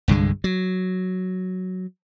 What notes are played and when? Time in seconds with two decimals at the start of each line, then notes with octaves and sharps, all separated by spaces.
0.08 C2 G2 D3 G#3
0.44 F#3